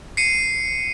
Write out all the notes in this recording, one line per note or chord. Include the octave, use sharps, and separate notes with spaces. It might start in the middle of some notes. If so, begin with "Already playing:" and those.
C7 C#7 D#7